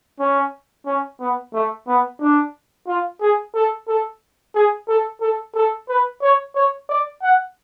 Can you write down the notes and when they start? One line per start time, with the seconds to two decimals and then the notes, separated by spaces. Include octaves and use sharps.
0.20 C#4
0.86 C#4
1.20 B3
1.53 A3
1.87 B3
2.20 D4
2.87 F4
3.21 G#4
3.54 A4
3.88 A4
4.55 G#4
4.88 A4
5.21 A4
5.55 A4
5.89 B4
6.22 C#5
6.55 C#5
6.89 D5
7.22 F#5